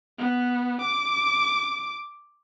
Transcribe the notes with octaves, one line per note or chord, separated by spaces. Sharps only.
B3
D6